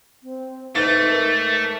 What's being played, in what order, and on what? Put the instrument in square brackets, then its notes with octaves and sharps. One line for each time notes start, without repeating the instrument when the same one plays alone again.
[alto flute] C4
[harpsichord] G#2 [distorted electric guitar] A3 [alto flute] B4
[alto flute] A#4